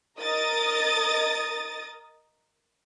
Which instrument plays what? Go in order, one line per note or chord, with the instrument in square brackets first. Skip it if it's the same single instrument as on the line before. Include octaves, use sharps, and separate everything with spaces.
[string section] A#4 D#5 D#6 A6